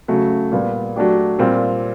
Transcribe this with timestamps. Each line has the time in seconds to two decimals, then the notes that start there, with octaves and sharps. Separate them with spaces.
0.08 C#3 F#3 A3
0.52 A#2 G3 B3
0.96 F#3 A3 D4 G4
1.39 A#2 G3 C4 F4